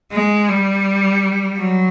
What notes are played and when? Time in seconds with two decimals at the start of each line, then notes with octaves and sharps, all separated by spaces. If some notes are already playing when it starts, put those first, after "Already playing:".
0.12 G#3
0.49 G3
1.59 F#3